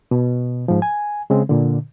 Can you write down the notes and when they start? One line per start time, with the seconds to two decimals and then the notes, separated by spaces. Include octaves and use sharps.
0.11 B2
0.68 G#2 F3
0.82 G#5
1.30 C#3 G#3 C4
1.49 A#2 D3